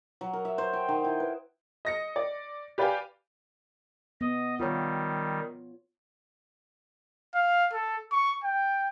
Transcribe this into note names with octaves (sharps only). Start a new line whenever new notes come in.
F#3
A#4
E5
C5
G5
D#3
E4
B4
D#5 A#6 C#7
D5
G4 B4 D5 F5 G5 G#5
B3 D#5
D#3 G3 F4 C#5
F5
A4
C#6
G5